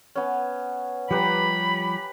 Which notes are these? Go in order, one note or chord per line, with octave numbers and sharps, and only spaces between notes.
B3 C#4
F3 G3 G4 B4 A#5 B5